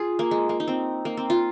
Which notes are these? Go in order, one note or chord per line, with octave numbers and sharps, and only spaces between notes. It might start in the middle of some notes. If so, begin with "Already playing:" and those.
Already playing: F4 G#4
A#3
G#3
A#3
D#4
C4
A#3
C4
F4